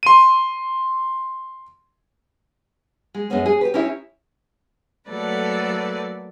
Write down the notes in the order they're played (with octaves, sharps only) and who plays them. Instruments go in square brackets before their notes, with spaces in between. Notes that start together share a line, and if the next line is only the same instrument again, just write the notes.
[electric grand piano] C6 D#7
[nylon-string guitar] G#3
F#2 G#3 A3 B3 C#4
G#4
G4 B4
C#4 D#4 E4 G4
[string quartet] F#3 A3 A#3 A4 B4 D5